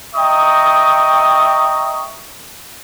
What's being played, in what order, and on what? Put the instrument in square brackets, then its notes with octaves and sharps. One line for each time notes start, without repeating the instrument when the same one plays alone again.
[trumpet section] D#5 E5 G5 A#5 C#6 D#6